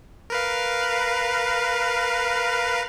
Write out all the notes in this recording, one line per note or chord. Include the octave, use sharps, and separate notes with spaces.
A#4 B4 F5